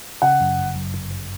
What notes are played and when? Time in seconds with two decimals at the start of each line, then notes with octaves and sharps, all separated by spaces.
0.22 C#3 F#5
0.40 F#2
0.58 G1
0.75 F#2
0.94 G1
1.11 G1